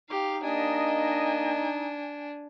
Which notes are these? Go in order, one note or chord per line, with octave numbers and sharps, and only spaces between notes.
D#4 G4 F5
A#3 D4 D#5 G#5